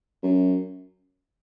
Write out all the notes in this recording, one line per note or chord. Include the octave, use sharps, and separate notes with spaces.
F#2